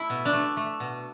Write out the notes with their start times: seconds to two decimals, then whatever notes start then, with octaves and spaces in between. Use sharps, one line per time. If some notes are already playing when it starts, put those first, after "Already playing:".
Already playing: A3 E4
0.10 B2
0.25 D4
0.33 A3
0.57 A3
0.80 B2